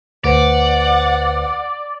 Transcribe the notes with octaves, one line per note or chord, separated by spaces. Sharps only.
D2 B4 C5 D5 F#5